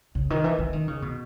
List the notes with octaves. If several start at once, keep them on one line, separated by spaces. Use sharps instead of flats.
C#3
D#3
E3
E3
D#3
C#3
B2